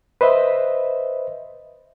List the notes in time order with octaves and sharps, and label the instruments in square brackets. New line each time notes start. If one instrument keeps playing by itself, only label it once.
[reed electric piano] B4 C5 D#5 E5